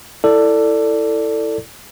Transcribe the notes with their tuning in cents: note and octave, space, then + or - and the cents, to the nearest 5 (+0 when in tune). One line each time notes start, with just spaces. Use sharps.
E4 +0 A4 +15 D5 +0